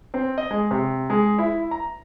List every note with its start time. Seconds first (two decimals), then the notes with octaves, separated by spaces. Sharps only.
0.14 C4
0.38 D#5
0.51 G#3
0.71 C3
1.10 G#3
1.38 E4
1.71 A#5